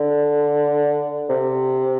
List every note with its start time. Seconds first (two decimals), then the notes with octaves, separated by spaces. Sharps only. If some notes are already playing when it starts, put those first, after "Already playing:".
Already playing: D3
1.30 C3